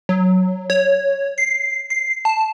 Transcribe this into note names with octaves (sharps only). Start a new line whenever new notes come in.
F#3
C#5
C7
C7
A5